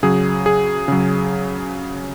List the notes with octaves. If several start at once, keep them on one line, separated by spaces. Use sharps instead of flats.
C#3 F#3 G#4
G#4
C#3 F#3